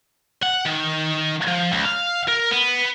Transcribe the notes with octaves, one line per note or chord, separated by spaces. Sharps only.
F#5
D#3
F3
C#2
F5
A#4
B3